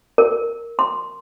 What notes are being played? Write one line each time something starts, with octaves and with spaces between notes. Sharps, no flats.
A#4
C6